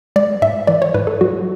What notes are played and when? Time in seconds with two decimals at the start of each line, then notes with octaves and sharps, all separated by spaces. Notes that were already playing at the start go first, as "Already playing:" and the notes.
0.16 G#3 D5
0.42 G#2 E5
0.67 E3 D5
0.82 C#5
0.94 G#2 B4
1.07 A4
1.21 F#3 F#4